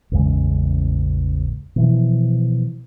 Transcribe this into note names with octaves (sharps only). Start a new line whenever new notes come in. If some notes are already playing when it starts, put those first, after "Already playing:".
A1 E2 C#3 G#3
B2 E3 F3